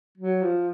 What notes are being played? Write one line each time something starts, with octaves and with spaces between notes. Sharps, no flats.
F#3
F3